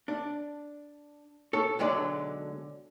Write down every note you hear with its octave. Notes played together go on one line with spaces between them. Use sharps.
D4
A4 C#5
B1 D3 F#3 G#3 D5